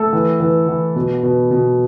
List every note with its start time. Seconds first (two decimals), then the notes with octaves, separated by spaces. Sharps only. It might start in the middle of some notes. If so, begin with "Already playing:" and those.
Already playing: A3 A4
0.13 E3
0.40 E3
0.68 E3
0.96 B2
1.23 B2
1.51 B2